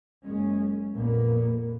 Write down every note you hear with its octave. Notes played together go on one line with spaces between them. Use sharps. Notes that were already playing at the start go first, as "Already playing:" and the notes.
F#1 G#3 C#4
A#1 F2 A#2 A#3 B3